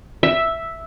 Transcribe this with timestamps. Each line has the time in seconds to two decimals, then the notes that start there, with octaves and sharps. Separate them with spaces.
0.23 E5